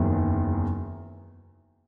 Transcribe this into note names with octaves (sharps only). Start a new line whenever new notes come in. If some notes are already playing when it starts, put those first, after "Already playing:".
Already playing: F#1 E2 D#3 F#3